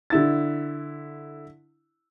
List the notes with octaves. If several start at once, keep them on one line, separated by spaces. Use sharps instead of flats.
D3 E4 A6